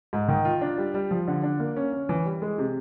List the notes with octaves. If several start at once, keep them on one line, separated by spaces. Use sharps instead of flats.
G#2
D#3
F4
D4
G3
G3
F3
D3
D4
A#3
C#4
C#4
E3
G3
G#3
C3